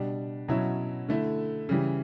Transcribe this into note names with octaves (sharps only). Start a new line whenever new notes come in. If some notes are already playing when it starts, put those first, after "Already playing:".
Already playing: B2 G3 D4
B2 F#3 C#4 E4
D3 A3 E4
C#3 E3 G3